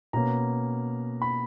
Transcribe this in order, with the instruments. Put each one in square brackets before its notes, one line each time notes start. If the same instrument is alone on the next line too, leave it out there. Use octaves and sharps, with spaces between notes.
[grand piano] B2 A#3 C#4 A#5
B5